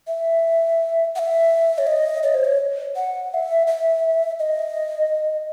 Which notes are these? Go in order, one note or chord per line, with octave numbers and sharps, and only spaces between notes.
E5
F#5
E5
C#5
D#5
C#5
C5
C#5
F#5
F#5
E5
E5
D#5